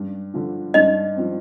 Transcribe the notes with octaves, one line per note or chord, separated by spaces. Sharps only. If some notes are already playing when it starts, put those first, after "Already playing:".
Already playing: G2
D3 F3
G2 D#4 D#5
F3 C4